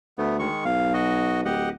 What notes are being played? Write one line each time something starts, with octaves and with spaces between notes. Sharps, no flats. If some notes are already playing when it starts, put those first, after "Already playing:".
D2 A3 B3
D#3 G#3 C#6
B1 F5
F#4 D#5
D1 G4 D#5 F#5